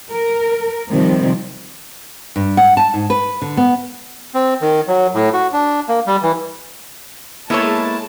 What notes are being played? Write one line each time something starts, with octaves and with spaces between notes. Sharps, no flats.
A#4
C3 D#3 F3 G3 C4
G2
F#5
A5
G#2
B4
D3
B3
C4
D#3
F#3
A2
F#4
D4
A#3
G3
E3
G#3 A#3 B3 E4 A4 C#5 A5